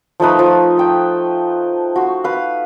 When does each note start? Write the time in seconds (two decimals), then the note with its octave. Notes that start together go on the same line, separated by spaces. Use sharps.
0.20 F3 A3 D#4 B4
0.39 F3
0.77 A4 G5
1.96 F#4 C5
2.24 B4 F5